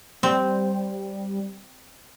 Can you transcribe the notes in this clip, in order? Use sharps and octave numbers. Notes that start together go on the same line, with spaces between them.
G3 C4